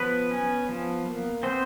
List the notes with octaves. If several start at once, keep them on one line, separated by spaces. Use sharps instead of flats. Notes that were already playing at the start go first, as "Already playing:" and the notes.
Already playing: F3 B3 B4
C#4
F3
A#3
B3 C4 C5